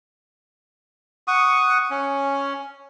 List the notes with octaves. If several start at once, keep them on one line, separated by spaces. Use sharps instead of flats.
F#5 C#6 D#6
C#4